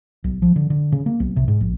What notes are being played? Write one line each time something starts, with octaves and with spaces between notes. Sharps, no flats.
B1
F3
D3
D3
C#3
A#3
B1
C3
G#2
A#1